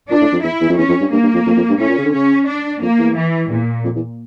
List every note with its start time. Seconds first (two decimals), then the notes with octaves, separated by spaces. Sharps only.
0.10 A#2 D4
0.21 A2
0.32 F2
0.43 E2 E4
0.61 E2
0.69 F2
0.78 E2 C#4
0.89 F2
1.01 G2
1.11 G2 A#3
1.23 G2
1.34 F2
1.46 F2
1.57 F2
1.69 G2
1.80 A2 C#4
1.88 A#2
1.98 C#3
2.05 D3
2.14 C#3 C#4
2.47 D4
2.82 F2 A#3
2.98 E2
3.16 E3
3.50 E2 A#2
3.84 F2
3.95 E2